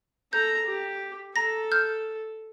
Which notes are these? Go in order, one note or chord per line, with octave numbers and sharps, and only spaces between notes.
A4 A#5 G6
G4
A4 A#5 A#6
F6 G6